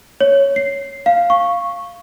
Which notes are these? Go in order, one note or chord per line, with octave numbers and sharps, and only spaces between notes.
C#5
C7
F5
C#6